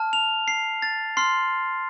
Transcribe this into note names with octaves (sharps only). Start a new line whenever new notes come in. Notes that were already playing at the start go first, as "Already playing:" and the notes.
Already playing: A5 F6
F7
C7
A6
C6 F6 C7